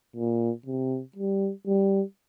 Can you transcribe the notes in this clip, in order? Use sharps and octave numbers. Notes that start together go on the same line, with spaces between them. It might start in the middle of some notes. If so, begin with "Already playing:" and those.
A#2
C3
G3
G3